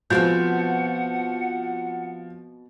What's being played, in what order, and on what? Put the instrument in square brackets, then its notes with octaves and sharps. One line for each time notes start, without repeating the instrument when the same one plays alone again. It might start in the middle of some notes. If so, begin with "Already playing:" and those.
[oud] B2 G#3 C4 [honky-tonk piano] F3 [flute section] F#5 [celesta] G6